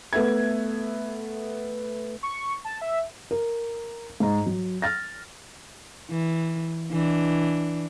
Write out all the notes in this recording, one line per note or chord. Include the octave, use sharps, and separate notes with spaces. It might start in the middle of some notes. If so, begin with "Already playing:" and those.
A3 B3 A4 E5 G#6
C#6
A5
E5
A#4
G#2 A#5
F#3
F6 A6 A#6
E3
E3 D4